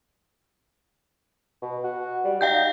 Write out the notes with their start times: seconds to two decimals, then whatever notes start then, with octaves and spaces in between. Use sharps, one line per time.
1.62 B2
1.84 F#4
2.25 G3
2.41 D#4 F5 G5 G6